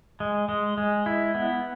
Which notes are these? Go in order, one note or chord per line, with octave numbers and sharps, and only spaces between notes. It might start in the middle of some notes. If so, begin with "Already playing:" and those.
G#3
G#3
G#3
E4
B3